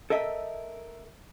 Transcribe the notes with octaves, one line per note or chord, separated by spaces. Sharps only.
A4 A#4 D#5 E5